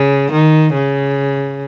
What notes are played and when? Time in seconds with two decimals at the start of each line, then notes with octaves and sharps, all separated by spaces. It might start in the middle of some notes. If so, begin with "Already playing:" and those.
Already playing: C#3
0.32 D#3
0.74 C#3